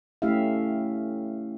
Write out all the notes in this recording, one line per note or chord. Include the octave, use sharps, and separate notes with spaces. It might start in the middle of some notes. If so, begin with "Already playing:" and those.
A3 C#4 E4 G4 E5 F5